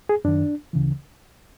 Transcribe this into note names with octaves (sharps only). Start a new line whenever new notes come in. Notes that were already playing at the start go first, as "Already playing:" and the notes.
G#4
F#2 D#3 D4
D2 C#3 E3